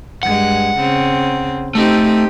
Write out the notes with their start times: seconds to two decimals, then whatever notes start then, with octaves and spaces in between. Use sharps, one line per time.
0.23 G2 G#3 F#5
0.78 C#3 C4
1.75 A3 C4 D#4 G4